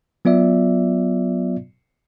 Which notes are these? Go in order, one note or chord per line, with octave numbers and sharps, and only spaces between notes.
F#3 B3 F4 D5 E5